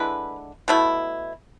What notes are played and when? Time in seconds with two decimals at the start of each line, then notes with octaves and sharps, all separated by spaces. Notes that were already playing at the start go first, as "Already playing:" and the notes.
Already playing: D3 G#3 E4 B4
0.68 B2 A3 E4